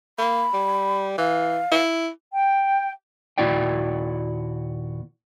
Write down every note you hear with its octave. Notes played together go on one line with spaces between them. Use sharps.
A#3 B5
G3
E3 F5
E4
G5
D#2 A#2 E4 F#4 D5 G5